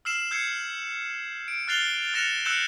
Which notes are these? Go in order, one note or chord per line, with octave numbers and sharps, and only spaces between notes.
E6 F6 C7 E7 F#7
E6 G6 G#6 C7 C#7
D7
F6 F#6 A6 C7 F7 G7
F6 F#6 A#6 C#7 E7 F7
E6 F#6 G6 C#7 E7 F#7